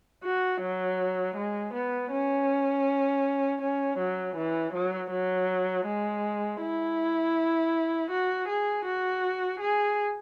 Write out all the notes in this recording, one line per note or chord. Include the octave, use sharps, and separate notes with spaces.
F#4
F#3
G#3
B3
C#4
C#4
F#3
E3
F#3
F#3
G#3
E4
F#4
G#4
F#4
G#4